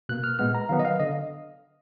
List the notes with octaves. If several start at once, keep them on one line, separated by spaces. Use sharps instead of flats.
B2 A#3 F#6
F6
A#2 G#3 B3 F6
A#5
D#3 F#3 B3 F5
D#5
F5
D3 D#5